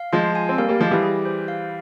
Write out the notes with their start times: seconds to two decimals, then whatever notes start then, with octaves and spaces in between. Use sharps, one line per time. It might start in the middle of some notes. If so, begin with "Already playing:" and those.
Already playing: F5
0.12 F3 G#3 F4
0.35 G#5
0.49 C4
0.58 G3 A#3 F5
0.69 G3 A#3
0.80 F3 G#3 G4
0.91 E3 G3
1.03 G#4
1.25 C5
1.48 F5